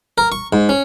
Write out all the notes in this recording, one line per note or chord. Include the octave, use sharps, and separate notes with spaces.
A#4
C#6
G#2
C#4